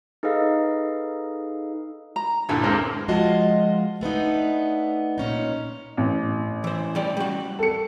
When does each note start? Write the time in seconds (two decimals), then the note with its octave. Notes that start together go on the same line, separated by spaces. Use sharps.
0.23 D#4 G#4 A4 B4 D#5 F5
2.16 A#5
2.49 D2 G2 A#2 E4 A4 G#5
2.64 G#3 A#3 C4
3.08 F3 G#3 F4 F#4 D#5 A5
4.01 A3 B3 D4 D#4
5.18 A#2 C#4 D#4
5.97 A1
6.64 E3 C5
6.95 G3 C#4 D5
7.17 G3 F#4
7.59 A4 C#7